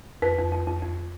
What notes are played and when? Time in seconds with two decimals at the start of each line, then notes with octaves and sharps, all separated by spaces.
0.22 F2 B4
0.38 F2
0.52 F2
0.67 F2
0.82 F2